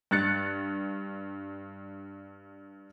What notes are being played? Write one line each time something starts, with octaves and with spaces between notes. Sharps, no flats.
G2 F#6 A6 C#7